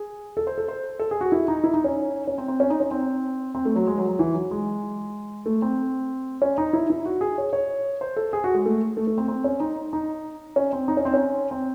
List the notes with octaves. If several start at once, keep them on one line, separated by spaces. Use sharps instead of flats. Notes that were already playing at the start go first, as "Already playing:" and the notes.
Already playing: G#4
A4
C5
A4
C5
A4
G#4
F#4
E4
D#4
E4
D#4
C#4
C#4
C4
C4
C#4
D#4
C#4
C4
C4
A3
F#3
G#3
F#3
F#3
E3
F#3
G#3
A3
C4
C#4
D#4
E4
E4
F#4
G#4
C#5
C#5
C5
A4
G#4
F#4
G#3
A3
A3
A3
C4
C4
C#4
D#4
D#4
C#4
C4
D#4
C#4
C4
C#4
C4